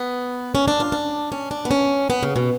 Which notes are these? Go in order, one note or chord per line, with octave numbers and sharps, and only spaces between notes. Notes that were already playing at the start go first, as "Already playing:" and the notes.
Already playing: B3
C#4
D4
F4
D4
C#4
D4
B3
C#4
B3
C#3
B2